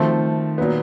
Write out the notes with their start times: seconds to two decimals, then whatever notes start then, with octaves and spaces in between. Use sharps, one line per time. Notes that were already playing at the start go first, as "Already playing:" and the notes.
Already playing: D#3 F3 A3 C4
0.58 A#2 F#3 B3